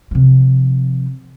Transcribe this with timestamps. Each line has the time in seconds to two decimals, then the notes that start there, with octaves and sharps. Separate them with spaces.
0.11 C3 F3